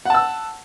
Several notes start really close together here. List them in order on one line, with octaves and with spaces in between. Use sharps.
F#5 A5 E6